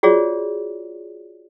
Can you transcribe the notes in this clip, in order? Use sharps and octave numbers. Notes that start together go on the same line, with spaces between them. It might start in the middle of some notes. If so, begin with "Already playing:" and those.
F4 F#4 G#4 C#5 D5